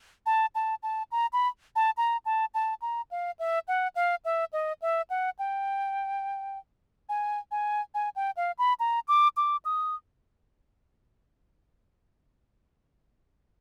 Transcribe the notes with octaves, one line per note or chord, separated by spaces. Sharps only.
A5
A5
A5
A#5
B5
A5
A#5
A5
A5
A#5
F5
E5
F#5
F5
E5
D#5
E5
F#5
G5
G#5
G#5
G#5
G5
F5
B5
A#5
D6
D6
D#6